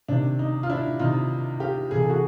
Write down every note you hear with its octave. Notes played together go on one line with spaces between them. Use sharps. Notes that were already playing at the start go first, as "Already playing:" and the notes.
C3 D#3 D4
D#4
F4
D4 E4
C3 D#3 D#4 F4
F4 G4
C3 E3 G#4
A4
F#4 G#4